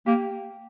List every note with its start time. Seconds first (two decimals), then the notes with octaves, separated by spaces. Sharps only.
0.06 A#3 G4